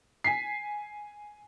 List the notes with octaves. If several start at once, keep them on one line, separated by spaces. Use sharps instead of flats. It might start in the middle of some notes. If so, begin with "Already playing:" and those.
G#5 B6 C7